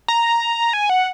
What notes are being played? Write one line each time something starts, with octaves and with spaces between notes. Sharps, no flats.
A#5
G#5
F#5